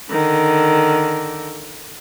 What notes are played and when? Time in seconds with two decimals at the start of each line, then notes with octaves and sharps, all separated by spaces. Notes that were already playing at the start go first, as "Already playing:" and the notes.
0.10 D3 D#3